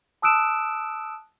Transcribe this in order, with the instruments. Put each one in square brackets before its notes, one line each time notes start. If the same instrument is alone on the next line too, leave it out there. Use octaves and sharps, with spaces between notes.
[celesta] A5 D#6 E6 F#6 D7 E7